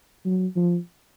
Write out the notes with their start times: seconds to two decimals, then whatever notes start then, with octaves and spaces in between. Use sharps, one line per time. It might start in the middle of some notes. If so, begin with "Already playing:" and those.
0.25 F#3
0.56 F3